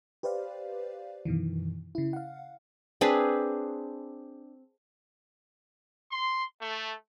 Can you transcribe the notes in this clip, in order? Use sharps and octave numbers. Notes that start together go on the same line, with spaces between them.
G4 B4 C5 D5 F5
F#2 B2 D#3 E3
C#3 E4
F5 F#5
C4 D4 G#4 B4
C6
A3